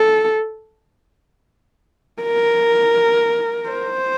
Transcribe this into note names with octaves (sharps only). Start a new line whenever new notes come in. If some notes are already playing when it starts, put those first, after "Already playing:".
Already playing: A4
A#4
C5